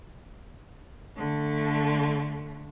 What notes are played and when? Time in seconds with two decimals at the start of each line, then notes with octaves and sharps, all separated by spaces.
1.16 D3 A3